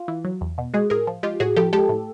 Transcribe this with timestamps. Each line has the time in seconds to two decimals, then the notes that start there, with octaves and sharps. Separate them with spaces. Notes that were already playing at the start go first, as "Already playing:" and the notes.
Already playing: F4
0.08 E3
0.25 F#3
0.41 E2
0.58 B2
0.74 G#3 F#4 G#4
0.90 A2 G#4 A#4
1.07 F3
1.23 G#3 F4 G4
1.40 A2 F#4 G#4
1.57 F3 G4 A4
1.73 G#3 G4 A4
1.89 A2